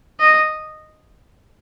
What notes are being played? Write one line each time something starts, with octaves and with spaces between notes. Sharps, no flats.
D#5